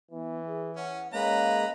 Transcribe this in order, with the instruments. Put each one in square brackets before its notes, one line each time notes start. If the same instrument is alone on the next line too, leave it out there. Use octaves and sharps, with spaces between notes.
[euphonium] E3 [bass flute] B3
[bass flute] G#4
[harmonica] C#4 [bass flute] F#5
[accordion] G#3 A#3 [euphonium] C#4 [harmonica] B4 A#5 [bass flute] F5